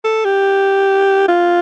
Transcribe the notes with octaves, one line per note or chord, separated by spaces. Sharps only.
A4
G4
F4